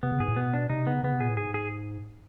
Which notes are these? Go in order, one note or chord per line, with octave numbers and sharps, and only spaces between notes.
C3 B3
C#3
G#2 G#4
A2
B2 B3
D4
C3 D#4
C#3 B3
C#3 B3
C3
A#2 G#4
A2
G#2 G#4
G#4